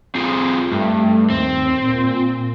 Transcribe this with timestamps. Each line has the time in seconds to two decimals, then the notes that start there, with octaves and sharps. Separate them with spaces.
0.15 C4 F4 G#4
0.72 G2 A3
1.30 D#2 C4
1.82 A#2